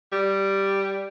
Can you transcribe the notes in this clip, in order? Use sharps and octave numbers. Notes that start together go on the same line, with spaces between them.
G3